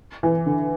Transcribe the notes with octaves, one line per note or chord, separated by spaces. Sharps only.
E3
D3